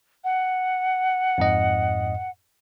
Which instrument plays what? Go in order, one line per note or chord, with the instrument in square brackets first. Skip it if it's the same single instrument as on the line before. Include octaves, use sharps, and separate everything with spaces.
[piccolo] F#5
[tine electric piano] F2 G#2 D#5